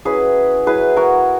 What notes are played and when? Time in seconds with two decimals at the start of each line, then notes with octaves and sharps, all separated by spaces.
0.05 F#3 C#4 E4 G#4 B4
0.66 F#3 C#4 E4 G#4 B4
0.96 F#4 A#4